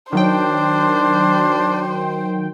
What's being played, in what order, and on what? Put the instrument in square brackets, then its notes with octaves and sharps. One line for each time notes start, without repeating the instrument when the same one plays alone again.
[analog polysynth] D#3 F#3 G5 [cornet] D4 [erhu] C5